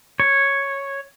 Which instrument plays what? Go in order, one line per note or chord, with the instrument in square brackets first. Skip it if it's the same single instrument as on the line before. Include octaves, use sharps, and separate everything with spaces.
[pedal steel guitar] C#5